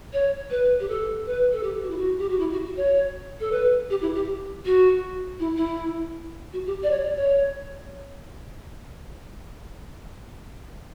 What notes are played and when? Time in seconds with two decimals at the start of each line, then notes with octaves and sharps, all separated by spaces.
0.13 C#5
0.50 B4
0.80 G4
0.89 A4
1.26 B4
1.52 A4
1.63 G4
1.83 F#4
1.90 E4
1.97 F#4
2.19 G4
2.29 F#4
2.39 E4
2.52 F#4
2.65 F#4
2.77 C#5
3.40 A4
3.52 B4
3.90 G4
4.02 E4
4.15 G4
4.65 F#4
5.40 E4
5.56 E4
6.53 F#4
6.66 G4
6.83 D5
6.91 C#5
7.04 D5
7.17 C#5